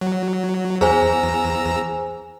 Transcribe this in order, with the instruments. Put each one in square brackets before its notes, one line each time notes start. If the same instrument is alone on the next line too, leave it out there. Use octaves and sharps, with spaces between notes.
[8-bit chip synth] F#3
[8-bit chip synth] E2 A#5 E6 [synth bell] G#4 C5 G#5